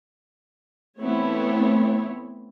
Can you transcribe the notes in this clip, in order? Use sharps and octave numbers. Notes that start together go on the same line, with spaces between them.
E3 A3 B3 C4 E4 C#5